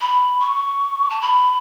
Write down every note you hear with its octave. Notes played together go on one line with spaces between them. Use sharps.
B5
C#6
A5
B5